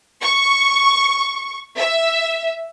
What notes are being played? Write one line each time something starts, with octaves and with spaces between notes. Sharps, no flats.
C#6
E5